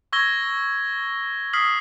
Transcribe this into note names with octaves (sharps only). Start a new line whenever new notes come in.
C#6 E6 G#6 A#6 G7
D#6 F6 B6 C7 F#7